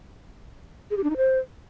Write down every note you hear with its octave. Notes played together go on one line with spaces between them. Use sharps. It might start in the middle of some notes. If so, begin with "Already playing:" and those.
G#4
G4
D4
D#4
C5